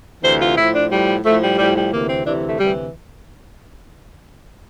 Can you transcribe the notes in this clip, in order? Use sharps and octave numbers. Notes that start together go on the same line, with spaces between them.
D2 C3 E3 C5
F4
A2 F3 E4
D4
A2 F3 G3
A2 F3 A3
G3
A2 F3 G3
G3
D2 C3 E3 A#3
C4
D2 C3 E3 D4
A3
D2 C3 E3 G3